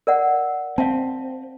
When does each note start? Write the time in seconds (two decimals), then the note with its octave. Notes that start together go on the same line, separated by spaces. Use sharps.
0.07 A#4 D5 F#5
0.78 C4 F5 A5